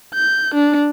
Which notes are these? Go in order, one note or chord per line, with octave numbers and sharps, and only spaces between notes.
G6
D4